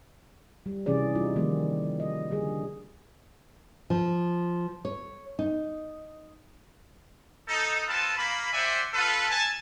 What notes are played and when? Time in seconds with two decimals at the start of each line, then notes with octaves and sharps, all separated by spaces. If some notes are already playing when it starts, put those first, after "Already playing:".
0.66 G3
0.86 C3 E3 C#4 G#4 D5
1.15 G3 D#4 F4
1.36 D#3 F3 G3 A#3
2.00 D#5
2.31 D3 G3 G#4
3.90 F3
4.85 C#5
5.39 D#4
7.48 D#4 A4
7.88 C4 F4 A4 B4 A5
8.17 A#3 B5
8.53 G4 C5 D5 E5 F#5 G#5
8.94 F4 A4 B4
9.30 G#5 A5